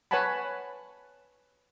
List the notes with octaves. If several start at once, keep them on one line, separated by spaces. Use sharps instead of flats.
B4 C#5 F#5 G#5 A5 B5